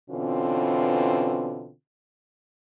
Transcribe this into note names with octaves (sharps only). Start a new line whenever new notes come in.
B2 D3 E3 C4 C#4 F4